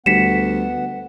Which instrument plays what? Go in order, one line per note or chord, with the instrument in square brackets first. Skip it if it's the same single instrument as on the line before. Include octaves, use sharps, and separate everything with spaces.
[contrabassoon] D2 [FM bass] G3 [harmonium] B3 F#5 [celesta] B6 C#7 E7